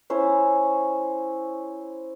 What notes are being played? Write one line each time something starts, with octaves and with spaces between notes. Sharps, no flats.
C#4 E4 C5